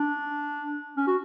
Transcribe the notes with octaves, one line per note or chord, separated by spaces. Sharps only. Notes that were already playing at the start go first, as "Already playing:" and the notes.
Already playing: D4
C#4
F#4